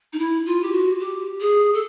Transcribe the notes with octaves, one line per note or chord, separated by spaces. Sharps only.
D#4
E4
F4
G4
F#4
G4
G#4
A4